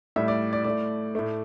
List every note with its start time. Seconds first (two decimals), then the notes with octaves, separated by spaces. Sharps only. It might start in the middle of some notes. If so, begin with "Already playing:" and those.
0.16 A2 G3 E5
0.28 D5
0.53 D5
0.64 A2 A3 D5
1.15 A2 A3